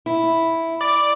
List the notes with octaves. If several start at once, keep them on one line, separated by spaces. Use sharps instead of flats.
E4
D5